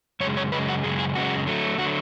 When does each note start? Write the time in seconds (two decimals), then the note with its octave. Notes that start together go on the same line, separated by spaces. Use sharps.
0.20 F#2 C#3 G#3 C#5
0.37 C#5
0.52 F#2 C#3 G#3 B4
0.68 F#4
0.83 F#2 C#3 G#3 G#4
0.99 G#4
1.15 F#2 C#3 G#3 F#4
1.47 D3 F#3 A3
1.78 D3 F#3 A3 F#4